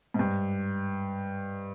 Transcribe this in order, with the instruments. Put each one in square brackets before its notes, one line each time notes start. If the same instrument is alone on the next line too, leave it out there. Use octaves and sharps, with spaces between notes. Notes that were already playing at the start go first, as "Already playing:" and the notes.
[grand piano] G#2
G2